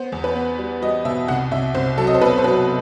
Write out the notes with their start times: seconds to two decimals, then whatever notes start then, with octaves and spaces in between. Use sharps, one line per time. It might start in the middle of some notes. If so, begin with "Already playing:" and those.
Already playing: B3 C5
0.12 E2
0.24 B4
0.35 B3
0.59 G3
0.82 G3 D#5
1.05 B2 E5
1.28 C2 F#5
1.51 C2 E5
1.74 C2 C5
1.98 F#3 A4
2.07 D#5
2.14 C5
2.21 B2 B4
2.38 C5
2.44 F#3 B4